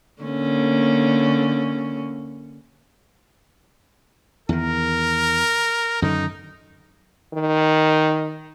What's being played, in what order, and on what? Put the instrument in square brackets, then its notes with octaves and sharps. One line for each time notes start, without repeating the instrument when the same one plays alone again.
[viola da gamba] D3 A#3 C#4
[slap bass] E2 D#3 [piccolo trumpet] A#4
[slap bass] F#2 D3 D#3 [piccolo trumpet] D#4
[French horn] D#3